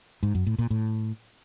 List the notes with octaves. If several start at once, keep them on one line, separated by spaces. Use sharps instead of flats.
G#2
F#2
A2
A#2
A2